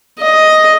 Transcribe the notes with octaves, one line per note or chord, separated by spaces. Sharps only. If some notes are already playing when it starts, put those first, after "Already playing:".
D#5